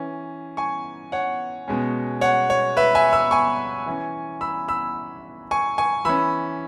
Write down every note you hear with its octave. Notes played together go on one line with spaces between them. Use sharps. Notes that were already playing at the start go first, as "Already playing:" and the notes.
Already playing: E3 C#4
G#5 C#6
C#5 F#5
B2 G#3 C#4
C#5 F#5
C#5
B4 E5
E5 G#5
B5 E6
G#5 C#6
E3 C#4
B5 E6
B5 E6
G#5 C#6
G#5 C#6
E3 C#4 B5 E6